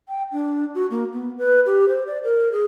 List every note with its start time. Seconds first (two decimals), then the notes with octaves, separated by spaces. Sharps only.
0.08 G5
0.32 D4
0.75 F#4
0.91 A#3
1.13 B3
1.38 B4
1.66 G4
1.89 C5
2.07 D5
2.23 A#4
2.52 G#4